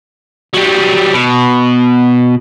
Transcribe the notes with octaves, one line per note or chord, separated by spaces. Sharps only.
F#3 G3
B2